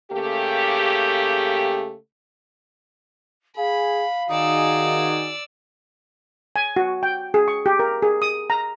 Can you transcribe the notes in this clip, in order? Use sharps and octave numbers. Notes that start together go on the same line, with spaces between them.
C#3 A3 A#3 G4
G#4 F5 G#5 B5
D#3 D#4 F#4 G#4 D5 E6
G#5
F#4
G5
G#4
C#6
G4
A#4
G#4
D#6
A#5